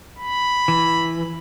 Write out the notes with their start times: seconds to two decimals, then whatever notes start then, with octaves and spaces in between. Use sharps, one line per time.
0.19 B5
0.68 E3